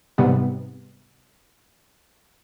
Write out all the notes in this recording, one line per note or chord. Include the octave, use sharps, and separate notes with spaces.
G#2 C3 G3 B3